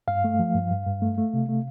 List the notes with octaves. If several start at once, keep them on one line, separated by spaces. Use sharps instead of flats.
G2 F5
A3
F3
G2
G2
G2
A3
A3
C3
A3